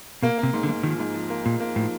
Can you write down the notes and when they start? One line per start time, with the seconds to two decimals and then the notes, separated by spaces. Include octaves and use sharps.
0.23 B2 A#3
0.38 A#3
0.43 C3
0.53 G#2
0.63 D3
0.69 G#2
0.83 D#3 F3
0.99 G#2
1.14 F3
1.30 A#3
1.45 A#2 F3
1.60 A#3
1.76 A2 F3